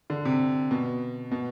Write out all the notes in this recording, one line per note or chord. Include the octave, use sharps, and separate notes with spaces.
D3
C3
B2
B2